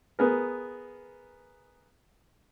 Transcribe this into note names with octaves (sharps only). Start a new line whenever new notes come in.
B3 G#4 A#4